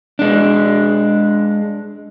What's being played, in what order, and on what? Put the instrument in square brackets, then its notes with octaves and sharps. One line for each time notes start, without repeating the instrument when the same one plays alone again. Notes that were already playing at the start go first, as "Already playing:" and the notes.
[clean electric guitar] G#3 D4